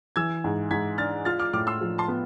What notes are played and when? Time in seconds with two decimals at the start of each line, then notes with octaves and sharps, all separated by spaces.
0.16 E3 E6 G#6
0.44 G#2
0.71 G#2 G#6 B6
0.98 D4 F6 A6
1.25 F4 F6 A6
1.39 D6 F6
1.53 A2 D6 F6
1.67 C6 E6
1.81 F3
1.98 A5 C6
2.08 B3